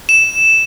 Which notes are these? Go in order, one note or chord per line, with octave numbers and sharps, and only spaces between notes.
E7